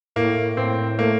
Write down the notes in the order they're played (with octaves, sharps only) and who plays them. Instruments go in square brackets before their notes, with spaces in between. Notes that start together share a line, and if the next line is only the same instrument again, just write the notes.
[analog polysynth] A2 [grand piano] A#3
[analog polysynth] A2 [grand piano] C4
[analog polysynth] A3 [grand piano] A#3